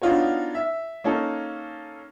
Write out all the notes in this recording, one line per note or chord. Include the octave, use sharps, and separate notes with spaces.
B3 D4 D#4 F4 F#4 C#5
E5
A#3 C#4 D#4 A4